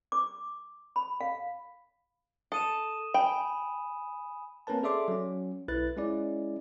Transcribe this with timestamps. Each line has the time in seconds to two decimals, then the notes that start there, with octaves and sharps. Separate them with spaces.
0.12 D6
0.96 B5
1.21 F5
2.52 A4 D#6 D#7 E7
3.14 G5 G#5 B5
4.67 A#3 C4 C#4 A#4 B4 A5
4.83 G#4 A4 D5 E5 C6 D6
5.08 F#3 C#4
5.68 B1 E4 B4 F#6 A6
5.97 G#3 C#4 E4 D5